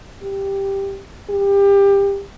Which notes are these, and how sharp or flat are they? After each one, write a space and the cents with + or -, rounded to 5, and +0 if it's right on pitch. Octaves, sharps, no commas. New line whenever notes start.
G4 +5
G4 +25